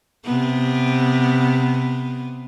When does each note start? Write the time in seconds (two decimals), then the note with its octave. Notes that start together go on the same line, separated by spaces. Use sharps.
0.24 C3 B3